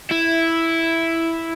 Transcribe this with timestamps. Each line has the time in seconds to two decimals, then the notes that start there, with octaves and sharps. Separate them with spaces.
0.11 E4